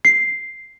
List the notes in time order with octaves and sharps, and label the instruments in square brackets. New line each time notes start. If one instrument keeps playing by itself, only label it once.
[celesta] C7